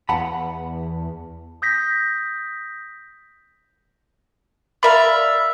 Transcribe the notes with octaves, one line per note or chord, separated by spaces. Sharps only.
E2 F#5 A5 B5
D#6 G6 A#6 B6
A#4 D5 E5 F5 B5